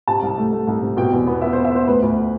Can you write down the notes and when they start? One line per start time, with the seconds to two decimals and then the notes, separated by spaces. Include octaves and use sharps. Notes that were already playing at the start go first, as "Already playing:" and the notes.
0.08 C3 A5
0.22 C2
0.38 A3
0.53 A3
0.67 C2
0.82 C3
0.97 B2 G5
1.13 E2
1.27 B3
1.41 B3 E5
1.53 B3 C5
1.65 E5
1.72 B3 C5
1.87 D2 B4
2.03 D2